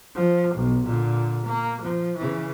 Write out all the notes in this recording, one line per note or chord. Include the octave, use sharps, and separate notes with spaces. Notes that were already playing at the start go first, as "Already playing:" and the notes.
F3
B1
A#2 D3
A#3
F3
C#3 E3